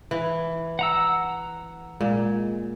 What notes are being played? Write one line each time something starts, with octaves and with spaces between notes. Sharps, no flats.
E3
F#5 A#5 E6
A#2 G#3